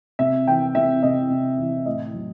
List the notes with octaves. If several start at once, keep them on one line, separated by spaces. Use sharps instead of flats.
C3 E5
E3 G5
C3 E5
C3 D#5
C3
E3
A2 D#5
F#3